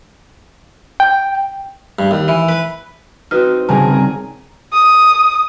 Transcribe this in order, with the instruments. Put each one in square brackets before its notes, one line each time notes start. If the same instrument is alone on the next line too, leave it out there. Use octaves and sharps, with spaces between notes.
[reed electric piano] G5
[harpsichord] G2
D#2
E3
B4
[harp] C4 D#4 [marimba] F#4 B4 F6
[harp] G1 C#3 G3 [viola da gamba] C4 G#4 [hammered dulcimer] A#4 G#5 A#5
[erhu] D#6